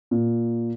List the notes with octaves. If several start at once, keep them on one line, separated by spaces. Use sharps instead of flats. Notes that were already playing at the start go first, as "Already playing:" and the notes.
A#2